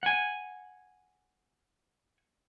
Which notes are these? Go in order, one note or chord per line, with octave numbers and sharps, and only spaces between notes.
F#5 G#5